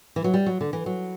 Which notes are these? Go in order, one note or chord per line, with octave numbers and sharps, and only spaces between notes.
E3
F#3
G3
F#3
D3
E3
F#3